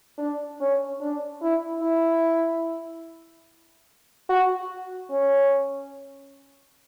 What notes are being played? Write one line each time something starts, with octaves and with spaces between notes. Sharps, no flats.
D4
C#4
D4
E4
E4
F#4
C#4